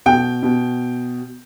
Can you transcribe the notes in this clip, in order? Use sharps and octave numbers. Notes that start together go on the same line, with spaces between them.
B2 G5
B2